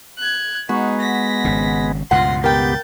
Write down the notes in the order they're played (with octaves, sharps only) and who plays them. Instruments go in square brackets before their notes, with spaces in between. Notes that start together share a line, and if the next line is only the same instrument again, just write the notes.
[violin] F#6 G#6
[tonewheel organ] G#3 B3 [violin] D#4 [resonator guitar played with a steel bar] F#4
[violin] A#6 B6
[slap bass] G#1 C#3
[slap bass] C#2 G2 B2 [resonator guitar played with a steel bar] F4 F#5 [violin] C6 A#6
[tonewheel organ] B3 G4 [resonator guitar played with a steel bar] A#4 G5 [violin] G6 A6